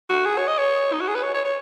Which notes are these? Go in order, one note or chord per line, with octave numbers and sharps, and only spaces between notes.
F#4
G#4
C#5
D#5
C#5
D#4
F#4
G#4
B4
C#5
C#5
C#5